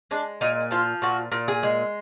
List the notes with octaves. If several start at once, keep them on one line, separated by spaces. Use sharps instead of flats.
G#3 D4
A#2 D#4
F3 F4
A#2 F#4
A#2
G#4
G#3